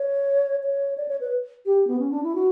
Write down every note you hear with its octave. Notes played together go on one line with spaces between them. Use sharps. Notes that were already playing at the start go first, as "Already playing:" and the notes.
Already playing: C#5
C#5
D5
C#5
B4
G4
B3
C#4
D4
E4
F#4